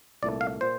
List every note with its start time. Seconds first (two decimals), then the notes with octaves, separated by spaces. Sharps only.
0.23 C2 A#2 A3 D5
0.41 F5
0.61 A#2 C5